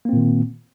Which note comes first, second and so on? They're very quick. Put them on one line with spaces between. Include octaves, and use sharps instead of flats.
A#3 C4 A#2 D#3